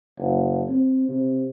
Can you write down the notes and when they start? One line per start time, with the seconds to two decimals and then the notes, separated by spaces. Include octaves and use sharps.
0.18 F#1
0.69 C4
1.09 C3